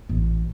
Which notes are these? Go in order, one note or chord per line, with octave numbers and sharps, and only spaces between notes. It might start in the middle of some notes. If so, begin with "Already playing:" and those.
A1